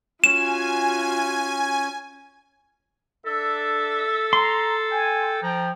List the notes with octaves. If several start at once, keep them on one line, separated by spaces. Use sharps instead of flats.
C#4 F4 F#4 G#5 E7
D4 A4 E5
A#5 C6
G5 G#5
F3 G5 A#5